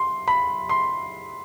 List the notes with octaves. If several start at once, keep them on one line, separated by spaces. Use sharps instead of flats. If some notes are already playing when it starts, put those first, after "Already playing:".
Already playing: C6
B5
C6